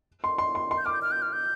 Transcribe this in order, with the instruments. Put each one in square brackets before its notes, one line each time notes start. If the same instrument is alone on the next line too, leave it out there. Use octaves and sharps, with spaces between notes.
[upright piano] C6
C6
C6
C6
[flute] G6
[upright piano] D6 [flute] F6
[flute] G6
F6
G6
F6
G6